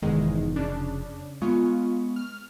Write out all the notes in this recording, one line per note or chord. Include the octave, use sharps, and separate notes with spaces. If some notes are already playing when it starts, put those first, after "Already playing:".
F1 E2 G#2 D#3 G#3
C#3 D4
G#3 B3 F4 C#6
F6